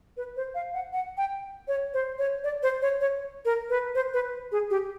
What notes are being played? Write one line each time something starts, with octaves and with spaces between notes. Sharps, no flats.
B4
C5
F5
F#5
F#5
G5
C#5
C5
C#5
D5
C5
C#5
C#5
A#4
B4
C5
B4
G#4
G4